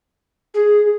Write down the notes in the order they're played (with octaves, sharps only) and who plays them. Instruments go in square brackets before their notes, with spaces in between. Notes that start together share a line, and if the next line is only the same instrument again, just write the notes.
[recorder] G#4